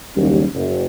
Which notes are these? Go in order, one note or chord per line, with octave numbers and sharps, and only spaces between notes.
F#1 D#2 G3 C#4
F#1